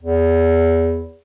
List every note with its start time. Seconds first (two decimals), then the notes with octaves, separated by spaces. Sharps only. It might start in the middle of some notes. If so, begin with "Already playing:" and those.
0.03 E2